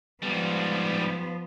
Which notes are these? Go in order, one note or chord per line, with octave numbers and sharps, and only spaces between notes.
G#2 F3 G3 B3